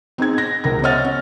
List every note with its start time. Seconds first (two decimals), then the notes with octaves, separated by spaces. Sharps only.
0.18 C4 D#4 G#4 G#6
0.38 A#6
0.64 C#2 B2 A#4 A#6
0.83 C#5 D#5 E5 F#5 F6 A6
1.04 C#4